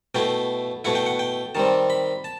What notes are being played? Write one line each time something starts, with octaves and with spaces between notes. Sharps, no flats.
B2 A3 E4 G5
B2 A3 E4 F#5
G5
F#5
G5
D#3 G3 C4 A5
B5
A5